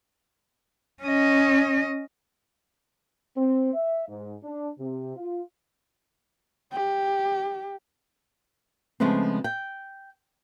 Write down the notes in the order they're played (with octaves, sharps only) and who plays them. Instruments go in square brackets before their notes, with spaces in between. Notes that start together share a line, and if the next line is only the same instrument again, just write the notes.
[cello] C#4 D#5
[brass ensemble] C4
E5
G#2
D4
C3
F4
[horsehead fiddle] G4
[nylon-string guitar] C#3 F3 G#3 A3 B3 C4
G5